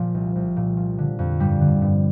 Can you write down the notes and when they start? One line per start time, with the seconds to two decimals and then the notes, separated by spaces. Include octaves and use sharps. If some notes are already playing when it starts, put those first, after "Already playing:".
Already playing: A#2 F3
0.14 C2
0.35 C2
0.57 A#2
0.77 F3
0.98 D3
1.19 F2
1.40 G2 G3
1.61 D3
1.82 G2